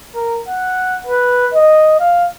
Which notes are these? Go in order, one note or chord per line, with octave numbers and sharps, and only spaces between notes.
A#4
F#5
B4
D#5
F5